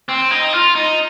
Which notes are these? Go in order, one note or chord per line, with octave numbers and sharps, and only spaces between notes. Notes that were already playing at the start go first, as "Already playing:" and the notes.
C4
D#4
F4
D#4